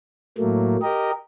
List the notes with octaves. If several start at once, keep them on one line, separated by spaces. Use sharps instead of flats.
A2 F#3 A3 A#3
G4 A#4 D#5